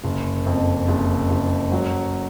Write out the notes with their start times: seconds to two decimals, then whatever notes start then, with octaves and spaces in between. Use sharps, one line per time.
0.04 F#1
0.46 F2
0.88 F#1
1.31 F#1
1.72 F#3